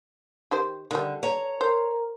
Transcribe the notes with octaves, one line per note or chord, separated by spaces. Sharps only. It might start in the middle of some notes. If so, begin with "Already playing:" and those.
D#3 G4 C5
D3 D#3 G3
C#5 A#5
A#4 C5